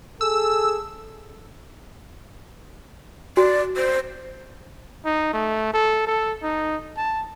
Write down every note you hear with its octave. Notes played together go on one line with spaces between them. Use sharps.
G#4 A4 E6
F#4 D5
C5
D#4
A3
A4
A4
D#4
A5